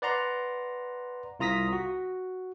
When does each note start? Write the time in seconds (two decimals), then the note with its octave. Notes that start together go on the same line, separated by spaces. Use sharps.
0.02 B4 D5 F#5 A#5 C6
1.40 C2 F4 A#5 D#6 A#6 B6
1.73 F#4